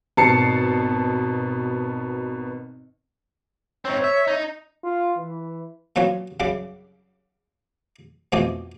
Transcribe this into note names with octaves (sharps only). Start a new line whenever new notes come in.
G#1 B2 A5 C7 C#7
G#2 C4 C#5
E5
D#4
F4
E3
A#2 F#3 B3 C#4 F4
F#2 C#3 G3 B5 D6
F2 B2 E3 A3 G4 D#6